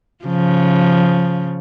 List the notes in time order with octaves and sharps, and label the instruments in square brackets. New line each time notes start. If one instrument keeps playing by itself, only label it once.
[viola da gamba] C#3 F3